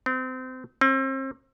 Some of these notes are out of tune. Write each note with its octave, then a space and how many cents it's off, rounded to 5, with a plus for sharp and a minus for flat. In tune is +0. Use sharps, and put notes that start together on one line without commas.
C4 -30
C4 +35